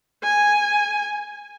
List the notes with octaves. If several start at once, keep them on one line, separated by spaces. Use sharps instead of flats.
G#5